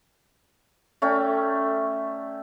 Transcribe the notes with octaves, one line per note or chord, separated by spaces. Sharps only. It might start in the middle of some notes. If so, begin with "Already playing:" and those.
A3 C#4 D5 G5